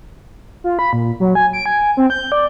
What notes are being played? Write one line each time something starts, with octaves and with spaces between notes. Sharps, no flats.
F4
B5
A#2
F#3
G#5
D7
G#5
C4
G6
D5